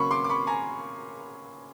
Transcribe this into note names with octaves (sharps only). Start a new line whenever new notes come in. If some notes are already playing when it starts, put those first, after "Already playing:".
Already playing: C#3 F#3 A#3 C#4 B5 C#6
C6 D6
D6
B5 C#6
G#5 A#5